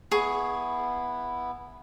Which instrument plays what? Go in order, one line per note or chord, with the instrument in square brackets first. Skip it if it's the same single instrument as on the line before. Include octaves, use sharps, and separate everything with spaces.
[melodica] B3 E4 [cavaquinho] G#4 C#6